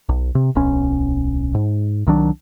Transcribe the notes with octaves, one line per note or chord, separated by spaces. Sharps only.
B1
C3
D1 B1 C#4
G#2
C2 D#3 F#3 D4